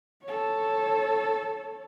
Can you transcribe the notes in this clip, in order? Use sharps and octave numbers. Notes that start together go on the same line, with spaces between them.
A4 C#5